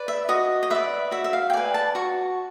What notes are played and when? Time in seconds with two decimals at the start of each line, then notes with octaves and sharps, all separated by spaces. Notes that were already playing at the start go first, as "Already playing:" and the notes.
Already playing: B4 D5
0.08 E5
0.29 F#4 D#5
0.63 D#5
0.70 B4 D5 E5
1.11 F#4 E5
1.24 E5
1.33 F5
1.50 G5
1.53 B4 D5 G#5
1.74 A5
1.95 F#4 C#6